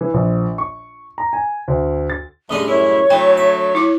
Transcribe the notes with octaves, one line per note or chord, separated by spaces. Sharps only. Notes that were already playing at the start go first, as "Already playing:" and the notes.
E3
A#1
C#6
A#5
G#5
D2
A6
A1 D3 G3 G#4 D#5
F#2 E4 C#5
D3 E3 F#3 A3 G5
E5
E4 D6